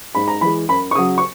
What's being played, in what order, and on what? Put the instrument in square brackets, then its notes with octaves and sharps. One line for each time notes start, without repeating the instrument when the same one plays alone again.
[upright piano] G#2 B5
A#5
E3 G#3 B5
F#2 B5
C#6
C#3 F#3 D#6
C#6